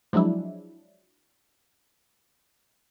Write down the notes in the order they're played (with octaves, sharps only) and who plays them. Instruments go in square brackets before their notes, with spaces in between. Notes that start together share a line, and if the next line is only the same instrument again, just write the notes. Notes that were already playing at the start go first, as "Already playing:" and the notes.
[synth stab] F3 F#3 G#3 D4 E4